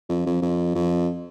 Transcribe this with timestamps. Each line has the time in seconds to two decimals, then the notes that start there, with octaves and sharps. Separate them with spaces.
0.09 F2
0.26 F2
0.42 F2
0.75 F2